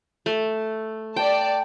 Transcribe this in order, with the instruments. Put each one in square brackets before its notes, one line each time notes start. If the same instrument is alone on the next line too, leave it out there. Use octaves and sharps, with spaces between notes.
[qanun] A3
[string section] D5 A5 [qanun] G5